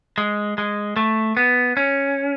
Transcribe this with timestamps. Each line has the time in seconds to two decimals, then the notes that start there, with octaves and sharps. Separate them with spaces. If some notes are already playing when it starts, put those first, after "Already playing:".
0.18 G#3
0.58 G#3
0.96 A3
1.37 B3
1.77 C#4